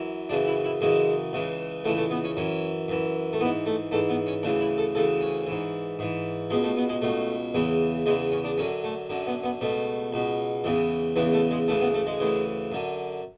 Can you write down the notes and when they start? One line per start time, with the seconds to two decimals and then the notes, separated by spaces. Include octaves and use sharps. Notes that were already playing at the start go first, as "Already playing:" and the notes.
Already playing: F#2 E3
0.29 F#2 C#3 E3 D4
0.47 E4
0.64 E4
0.81 F#2 C#3 E3 G#3
1.33 C#2 C#3 E3
1.84 C#2 C#3 E3 A3
1.97 A3
2.11 B3
2.24 C#4
2.37 F#2 E3 C#4
2.88 F#2 E3
3.33 A3
3.40 E3 B3
3.44 G#2
3.66 A3
3.91 G#2 E3 A3
4.09 B3
4.26 C#4
4.43 D2 C#3 E3 D4
4.61 E4
4.78 A4
4.95 D2 C#3 E3 A4
5.21 C#4
5.47 G#2 E3
5.99 G#2 E3
6.50 C#2 B2 G#3
6.64 A3
6.77 B3
6.89 G#3
7.02 C#2 B2 A3
7.54 E2 C#3 E3
8.06 E2 C#3 E3 G#3
8.32 C#4
8.44 D4
8.58 F#2 D3 C#4
8.84 A3
9.09 F#2 D3
9.27 B3
9.43 B3
9.61 C#2 B2 A3
10.12 C#2 B2
10.64 E2 C#3 E3
11.16 E2 C#3 E3 B3
11.33 A3
11.51 G#3
11.68 D2 C#3 E3 A3
11.81 B3
11.94 A3
12.07 G#3
12.20 D2 C#3 E3
12.72 F#2 D3